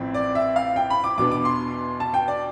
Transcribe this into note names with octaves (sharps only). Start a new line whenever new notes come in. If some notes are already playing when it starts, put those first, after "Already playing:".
Already playing: A1 A2 F3 C4
D5
E5
F5
G5
B5
D6
E2 B2 B3 D4 D6
D6
C6
A5
G5
D5